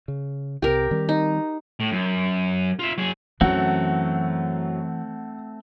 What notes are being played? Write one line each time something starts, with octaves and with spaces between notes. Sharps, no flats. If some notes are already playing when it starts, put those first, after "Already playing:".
C#3
C2 C3 G4 A#4
D#3 G3 C4
D#4
A2
F#2
F4 E5
F#3 G#4
F#2 E3 F#3 A3 C4 F#5